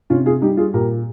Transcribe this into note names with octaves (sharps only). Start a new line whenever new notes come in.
C3 C#4 F4
F4 G#4
G3 D#4 G4
F4 G#4
A#2 G4 A#4